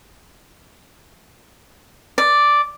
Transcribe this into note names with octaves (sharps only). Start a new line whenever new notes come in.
D5